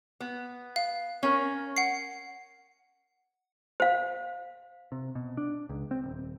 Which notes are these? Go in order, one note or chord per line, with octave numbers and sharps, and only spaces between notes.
B3
F5
C#4 A#4
F#5 C7
C5 F5
C3
B2
D4
C#2
C4
D#1